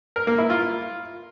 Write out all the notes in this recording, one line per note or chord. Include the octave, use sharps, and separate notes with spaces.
A#4
A#3
E4
F4